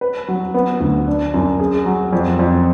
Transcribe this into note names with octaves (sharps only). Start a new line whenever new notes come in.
B4
F#3
B3
D2
D4
F#2
G#4
F#3
F2
F2